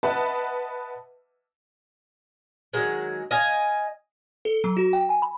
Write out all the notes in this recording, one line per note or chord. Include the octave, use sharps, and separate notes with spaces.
B4 D#5 E5 F#5 A5 B5
D#3 F#3 G#3
D#5 F5 G#5
A4
F#3
F#4
G5
G#5
B5